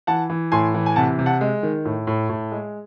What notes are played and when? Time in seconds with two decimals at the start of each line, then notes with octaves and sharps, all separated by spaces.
0.07 E3 F#5 A5
0.30 E3
0.52 A2 G#5 C6
0.74 E3
0.86 G#5
0.96 C3 F#5 A5
1.19 C3
1.26 F#5 A5
1.41 G#3
1.63 D#3
1.85 A2
2.07 A2
2.29 A2
2.52 G#3